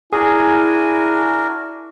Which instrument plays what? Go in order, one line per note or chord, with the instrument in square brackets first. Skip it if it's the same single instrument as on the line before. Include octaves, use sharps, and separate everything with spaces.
[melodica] D4 F#4 A#4 [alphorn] E4 [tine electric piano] G#4 [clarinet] G#5